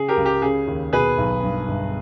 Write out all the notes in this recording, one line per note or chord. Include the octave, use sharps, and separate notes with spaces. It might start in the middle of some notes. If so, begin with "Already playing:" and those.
Already playing: C#3 G#4
G4 A#4
C#2
G4
C#3 G#4
D#2
B2 G#4 B4
B1
G2
G1